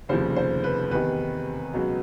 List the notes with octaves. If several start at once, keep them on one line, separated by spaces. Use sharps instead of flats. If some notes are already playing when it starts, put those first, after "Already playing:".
F1 D#2 C#3 F3 C5
C5
B4
E2 C3 D#3 B4
C#2 B2 F#3